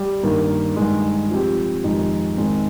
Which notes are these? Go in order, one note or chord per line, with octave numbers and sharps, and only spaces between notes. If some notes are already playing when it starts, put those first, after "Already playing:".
Already playing: G3
G2 D#3 A#3
G2 D#3 G#3
F3 C4 G4
F2 D#3 G#3 D#4 G4
G#2 D#3 G#3 C4